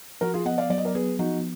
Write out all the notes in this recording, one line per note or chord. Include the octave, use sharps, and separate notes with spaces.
F3 F#4 A#4
F4 G#4
B3 D#5 F#5
D5 F5
F#3 D5
D#5
A#4 D5
B3 G#4 B4
F3 D#4 F#4